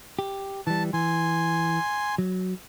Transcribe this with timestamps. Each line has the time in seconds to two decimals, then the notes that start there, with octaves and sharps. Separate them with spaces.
0.19 G4
0.67 E3 G3 A5
0.93 E3 G#5 C6
2.18 F#3